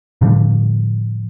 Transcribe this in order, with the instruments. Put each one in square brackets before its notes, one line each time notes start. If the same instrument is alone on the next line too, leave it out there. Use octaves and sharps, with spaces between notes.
[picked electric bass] A2 D3 F3 G3